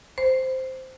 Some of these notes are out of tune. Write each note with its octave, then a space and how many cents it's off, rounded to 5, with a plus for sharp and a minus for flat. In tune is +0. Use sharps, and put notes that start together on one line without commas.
C5 -5